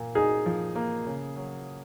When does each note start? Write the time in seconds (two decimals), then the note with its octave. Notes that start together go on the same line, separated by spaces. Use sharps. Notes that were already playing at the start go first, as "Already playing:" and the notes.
Already playing: A#2 A#3
0.15 D#4 G#4
0.46 F3
0.76 A#3
1.06 C#3
1.36 F#3